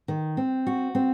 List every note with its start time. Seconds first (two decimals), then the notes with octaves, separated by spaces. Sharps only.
0.08 D#3
0.37 C4
0.67 F#4
0.95 C4